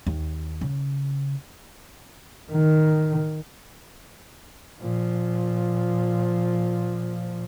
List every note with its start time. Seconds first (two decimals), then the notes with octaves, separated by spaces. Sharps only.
0.07 D#2
0.61 C#3
2.51 D#3
4.81 A#2 F3